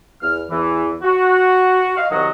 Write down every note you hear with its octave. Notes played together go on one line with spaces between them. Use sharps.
E2 F6
E2 E3
F#4
D#5 F5
C2 D#3 F#3 F#4 D#5